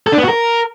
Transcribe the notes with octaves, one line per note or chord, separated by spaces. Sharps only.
A4
D4
B3
F#4
A#4